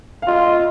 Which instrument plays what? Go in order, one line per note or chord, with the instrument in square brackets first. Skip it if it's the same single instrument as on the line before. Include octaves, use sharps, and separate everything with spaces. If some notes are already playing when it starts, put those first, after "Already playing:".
[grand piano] F5
[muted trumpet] F4 [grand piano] D#5
[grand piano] F5
D#5